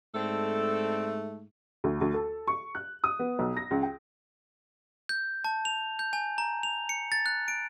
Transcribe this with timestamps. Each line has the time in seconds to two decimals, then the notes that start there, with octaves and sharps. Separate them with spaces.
0.14 G#2 A3 C4 D4 A4
1.84 D2
2.01 D2
2.14 A4
2.47 C#6
2.75 F#6
3.04 D#6
3.19 B3
3.39 B1
3.57 A#6
3.71 C#2
3.83 G5
5.09 G6
5.44 A5
5.65 F7
5.99 G6
6.13 G#5
6.38 A#5
6.63 F7
6.89 C#7
7.12 A6
7.26 F#6
7.48 D7